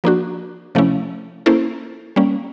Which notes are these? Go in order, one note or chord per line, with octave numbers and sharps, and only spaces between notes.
F3 A#3 D4 F#4
C3 F3 A3 C#4 E4
A#3 C#4 E4 A4 C5
G3 A#3 C#4